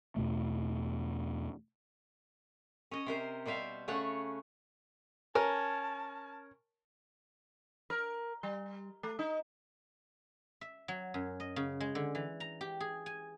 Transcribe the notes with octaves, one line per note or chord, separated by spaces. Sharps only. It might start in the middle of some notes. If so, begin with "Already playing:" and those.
E2 B2 A3
C#4 D#5
C3 A#4 C5
B2 G3 C5 E5 F5
C#3 A3 C#4 C#5 F#5
C#4 A#4 A5
A#4
G3
A3
D#4
E5
F#3
F#2
D#5
C#3
G#3
D3
E3
A#5
G4
G#4
G#5